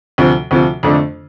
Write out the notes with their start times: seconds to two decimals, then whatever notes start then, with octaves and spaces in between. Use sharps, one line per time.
0.18 D2 C3 F3
0.51 D2 C3 F3
0.83 F2 D3 A3 D4